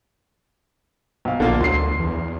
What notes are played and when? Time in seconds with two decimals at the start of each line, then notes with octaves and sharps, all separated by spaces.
1.25 B1 F5
1.40 A#1 D3 A#3 F4
1.61 D2 F#3 C6 C7
1.99 E2